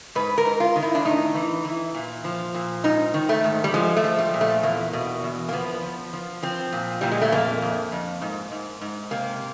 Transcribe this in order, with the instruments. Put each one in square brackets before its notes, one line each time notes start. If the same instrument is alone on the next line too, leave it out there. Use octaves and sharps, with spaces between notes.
[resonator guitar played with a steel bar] G#2 B4
A#4
G#2
F4
D#3
E4
D4
A2 D#4
E3
E3
A#2
F3
A#2
G#2 D#4
D#3
A3
G#2
G3
F3 G#3
A3
F3
G3
A#2
A3
E2 A#3
B2
E2
A#3
F3 B3
F3
F3
F3 C4
A#2
A#2 G3
G#3
A3
F2 A#3
F2
F2
G#2
G#2
G#2
C3 A#3